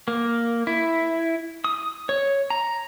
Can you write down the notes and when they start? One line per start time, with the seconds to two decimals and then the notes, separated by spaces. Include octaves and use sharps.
0.08 A#3
0.67 E4
1.64 D#6
2.09 C#5
2.50 A#5